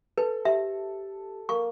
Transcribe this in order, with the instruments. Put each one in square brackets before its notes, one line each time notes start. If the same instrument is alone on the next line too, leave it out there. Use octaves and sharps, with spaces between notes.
[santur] A4 [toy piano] B4
[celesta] G4 [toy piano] E5
[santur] A#3 [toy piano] C#6